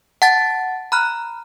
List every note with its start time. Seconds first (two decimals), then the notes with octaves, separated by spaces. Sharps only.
0.22 F#5 A5 A6
0.92 A#5 B5 F6 F#6